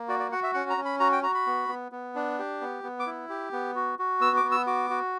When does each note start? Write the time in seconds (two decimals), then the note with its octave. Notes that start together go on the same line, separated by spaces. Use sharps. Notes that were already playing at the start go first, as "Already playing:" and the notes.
Already playing: A#3
0.08 F#4 D5
0.19 D5
0.32 F#4 F#5
0.43 E5
0.54 C#4 F#5
0.70 A#5
0.77 C#4
0.85 B5
1.00 F#4 A#5
1.12 G5
1.23 F#4 A#5
1.34 B5
1.46 B3
1.68 B3
1.92 B3
2.15 D4
2.38 G4
2.61 B3
2.83 B3
2.99 D6
3.07 E4
3.29 G4
3.53 B3
3.75 F#4
3.99 F#4
4.21 B3 E6
4.37 D6
4.44 B3
4.51 E6
4.67 F#4 D6
4.90 F#4